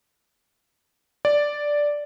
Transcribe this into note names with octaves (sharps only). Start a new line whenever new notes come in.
D5